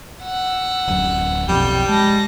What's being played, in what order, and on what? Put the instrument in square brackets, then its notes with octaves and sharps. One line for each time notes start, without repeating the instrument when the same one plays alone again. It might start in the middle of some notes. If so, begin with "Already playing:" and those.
[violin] F#5 E6
[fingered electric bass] D1 F#2
[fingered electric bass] B1 F2 [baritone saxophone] G3 [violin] G5
[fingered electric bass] G#3 [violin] A5 A#6